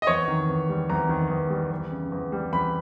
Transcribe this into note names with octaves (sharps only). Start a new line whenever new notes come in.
D#5
E2 C#5
D#3
E2
G3
E2 A#5
D#3
E2
G3
E2
C#3
E2
G3
E2 B5